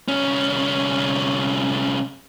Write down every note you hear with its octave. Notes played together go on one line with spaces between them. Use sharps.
C2 C#4